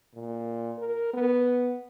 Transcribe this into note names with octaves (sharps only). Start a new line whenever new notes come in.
A#2
A#4
B3